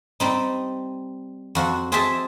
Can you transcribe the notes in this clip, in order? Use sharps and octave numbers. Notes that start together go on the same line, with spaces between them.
G3 C4 D#4
F2 F#4 C5 F#5
C4 G#4 C5 D#5 E5 A5